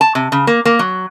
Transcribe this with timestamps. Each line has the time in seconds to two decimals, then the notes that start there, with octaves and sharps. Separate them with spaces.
0.01 A5
0.15 C3
0.32 C#3
0.47 A#3
0.65 A#3
0.79 F#3